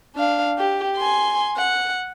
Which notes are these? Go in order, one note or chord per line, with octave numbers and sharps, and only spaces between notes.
D4 F5
G4
G#5 C6
F#5